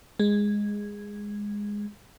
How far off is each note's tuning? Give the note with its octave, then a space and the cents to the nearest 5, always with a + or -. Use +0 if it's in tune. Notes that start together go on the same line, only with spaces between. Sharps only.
G#3 -10